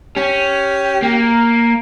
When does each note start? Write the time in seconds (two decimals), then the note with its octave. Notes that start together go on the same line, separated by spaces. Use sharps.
0.16 C#4 G4
1.02 A#3